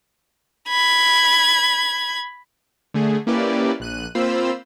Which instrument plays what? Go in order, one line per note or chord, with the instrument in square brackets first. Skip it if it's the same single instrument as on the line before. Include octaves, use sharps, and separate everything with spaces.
[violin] B5 G#6
[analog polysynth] D3 A3 G#4
A#3 C#4 E4 G4 B4 D5
A#1 F#6 D#7
A#3 C4 F4 C5 B5 E6